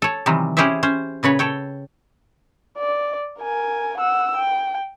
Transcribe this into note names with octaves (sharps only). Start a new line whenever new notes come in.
A4 C#5
C3 D#3 E3 F#3 G3
C#4 E4 G4 G#4 C5 E5
C#4 C5
A#2 C#3 B4 C#5
A4 C#5 G5
D5
A#4 G#5
F#5 E6
G5